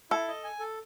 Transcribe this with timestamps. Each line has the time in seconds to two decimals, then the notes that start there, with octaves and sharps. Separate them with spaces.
0.11 E4 A4
0.28 D#5
0.44 G#5
0.60 A4